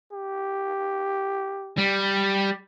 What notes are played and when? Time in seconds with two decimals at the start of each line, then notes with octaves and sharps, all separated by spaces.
0.12 G4
1.78 G3